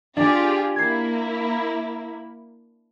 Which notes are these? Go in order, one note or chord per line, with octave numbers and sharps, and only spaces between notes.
D4 F4 G4 G#4
A#3 E4 G#6 C7